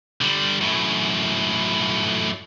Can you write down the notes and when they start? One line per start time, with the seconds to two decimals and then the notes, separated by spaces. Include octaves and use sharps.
0.21 D3 G3
0.61 F#2 A2